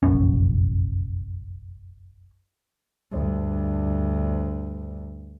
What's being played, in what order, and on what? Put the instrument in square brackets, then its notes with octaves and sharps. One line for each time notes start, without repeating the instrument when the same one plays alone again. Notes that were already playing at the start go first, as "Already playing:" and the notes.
[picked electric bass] F1 A#1 F#2 C#4
[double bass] D2 G2